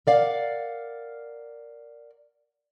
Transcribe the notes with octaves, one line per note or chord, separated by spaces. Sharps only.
A#4 D5 F5 F#5